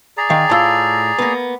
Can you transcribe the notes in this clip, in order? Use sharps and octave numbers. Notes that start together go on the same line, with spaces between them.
G#4 D5 A#5
D#3 F5 G5
A2 F4 A5 E6
A#3 B3 B4